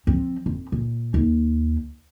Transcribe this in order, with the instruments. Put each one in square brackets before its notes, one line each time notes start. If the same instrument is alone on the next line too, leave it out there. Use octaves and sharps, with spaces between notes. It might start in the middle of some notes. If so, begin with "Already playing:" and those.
[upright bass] F3 C4
F2
A#2
D#2